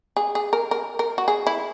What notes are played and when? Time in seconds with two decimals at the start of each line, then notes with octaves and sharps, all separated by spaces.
0.17 G#4
0.35 G#4
0.53 A#4
0.71 A#4
0.99 A#4
1.18 F#4
1.28 G#4
1.47 E4